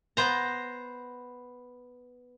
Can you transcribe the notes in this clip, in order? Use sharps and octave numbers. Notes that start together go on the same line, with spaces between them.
B3 C5 A#5